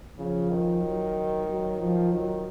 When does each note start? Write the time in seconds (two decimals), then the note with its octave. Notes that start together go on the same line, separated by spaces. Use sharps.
0.18 C#3 F3
0.51 D#3
0.82 F#3
1.48 F#3
1.81 F3
2.13 D#3 F#3